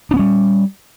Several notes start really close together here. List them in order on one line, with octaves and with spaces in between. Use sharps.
D4 B3 C#4 G3